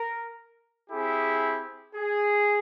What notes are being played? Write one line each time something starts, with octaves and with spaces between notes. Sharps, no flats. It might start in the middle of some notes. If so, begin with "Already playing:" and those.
Already playing: A#4
C4 E4 G4 G#4
G#4